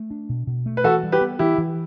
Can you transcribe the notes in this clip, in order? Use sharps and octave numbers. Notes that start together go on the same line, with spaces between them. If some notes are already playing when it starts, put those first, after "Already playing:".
Already playing: A3
D4
B2
B2
A3
B4
E3 F#4 A4
G3
G4 B4
B3
E3 E4 G4
E3